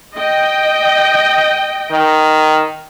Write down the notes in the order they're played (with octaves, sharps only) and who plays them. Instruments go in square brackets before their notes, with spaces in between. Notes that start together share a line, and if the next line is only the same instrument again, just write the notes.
[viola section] D#5 G5
[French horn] D#3